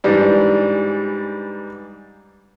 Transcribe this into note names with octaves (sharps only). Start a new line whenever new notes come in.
G#2 E3 G3 D4